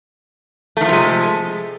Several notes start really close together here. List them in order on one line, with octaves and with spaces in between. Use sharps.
A3 D#3 F3 C3 G#3